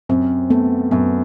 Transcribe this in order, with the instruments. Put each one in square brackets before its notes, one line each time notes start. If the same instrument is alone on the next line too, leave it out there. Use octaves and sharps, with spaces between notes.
[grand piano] F#2 [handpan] C4
[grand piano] A3 [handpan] B3
[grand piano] F#2 [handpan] B3